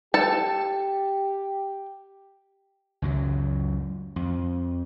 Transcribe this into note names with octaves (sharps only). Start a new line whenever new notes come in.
G4 A4 A5
C#2 F#2 F#3
F2